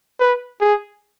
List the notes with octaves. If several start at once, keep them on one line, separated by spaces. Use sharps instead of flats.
B4
G#4